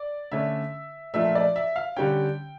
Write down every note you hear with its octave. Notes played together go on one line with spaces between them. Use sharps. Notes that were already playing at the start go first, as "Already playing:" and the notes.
Already playing: D5
D3 A3 C#4 E5
A#2 F3 A3 D4 E5
D5
E5
F5
D3 G3 C#4 G5